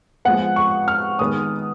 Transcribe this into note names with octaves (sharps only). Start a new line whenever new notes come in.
F3 G#3 B3 F#5
C#6
F6
D#3 G#3 B3 D#6